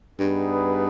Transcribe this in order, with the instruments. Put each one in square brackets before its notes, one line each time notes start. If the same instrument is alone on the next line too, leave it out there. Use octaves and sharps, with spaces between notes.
[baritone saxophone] G2 [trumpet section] G3 B3 D#4 G#4 B4